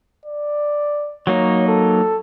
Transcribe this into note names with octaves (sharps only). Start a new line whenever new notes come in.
D5
F#3 A#3 D#4 C#5
A4